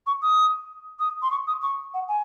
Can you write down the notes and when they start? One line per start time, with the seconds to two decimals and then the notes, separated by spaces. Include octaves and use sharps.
0.06 C#6
0.22 D#6
0.99 D#6
1.22 C6
1.31 C#6
1.47 D#6
1.62 C#6
1.94 F#5
2.09 G#5